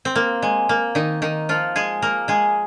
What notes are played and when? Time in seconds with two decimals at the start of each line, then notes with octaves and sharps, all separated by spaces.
0.05 C4
0.15 A#3
0.42 G#3
0.69 A#3
0.95 D#3 D#4
1.22 D#3 D#4
1.49 F3 F4
1.76 G#3 G#4
2.02 A#3 A#4
2.28 G#3 G#4